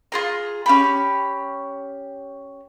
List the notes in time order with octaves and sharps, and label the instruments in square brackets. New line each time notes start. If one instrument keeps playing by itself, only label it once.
[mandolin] F4 G#4 A#5
C#4 G4 B5